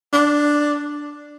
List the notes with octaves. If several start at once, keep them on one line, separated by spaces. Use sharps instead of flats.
D4